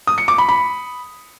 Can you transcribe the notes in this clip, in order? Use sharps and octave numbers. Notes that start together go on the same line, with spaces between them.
D#6
C#7
D6
B5
B5